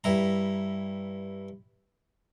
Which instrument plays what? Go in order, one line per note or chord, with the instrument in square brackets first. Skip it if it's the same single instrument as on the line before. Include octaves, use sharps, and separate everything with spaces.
[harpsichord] G2 E4 A#5